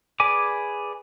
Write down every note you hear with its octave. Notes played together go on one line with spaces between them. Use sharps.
G#4 B4 D5 G#5 D6